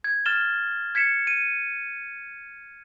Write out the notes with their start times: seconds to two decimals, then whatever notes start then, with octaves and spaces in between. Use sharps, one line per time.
0.04 G#6
0.26 F6 A6 E7 G7
0.95 G#6 B6 C#7 E7
1.27 D#7